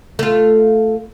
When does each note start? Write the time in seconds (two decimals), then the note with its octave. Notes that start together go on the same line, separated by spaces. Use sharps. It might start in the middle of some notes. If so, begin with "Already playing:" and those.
0.19 A3 F4